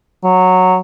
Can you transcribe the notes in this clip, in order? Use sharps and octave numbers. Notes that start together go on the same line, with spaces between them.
F#3